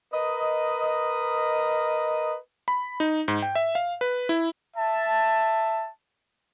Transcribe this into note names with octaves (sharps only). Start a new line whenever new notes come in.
A#4 B4 D#5
B5
D#4
G#2
G5
E5
F5
B4
E4
E5 A5